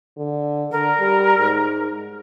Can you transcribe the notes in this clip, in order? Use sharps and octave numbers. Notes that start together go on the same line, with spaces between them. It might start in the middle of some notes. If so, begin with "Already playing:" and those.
D3
D3 A#4
G3
G#2